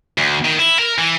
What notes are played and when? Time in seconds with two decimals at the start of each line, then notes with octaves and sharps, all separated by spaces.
0.18 D2
0.45 D#3
0.59 E4
0.79 A#4
0.98 E3